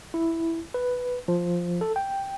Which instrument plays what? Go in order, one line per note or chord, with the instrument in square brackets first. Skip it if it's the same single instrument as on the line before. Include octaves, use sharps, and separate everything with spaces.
[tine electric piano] E4
B4
F3
A4
G5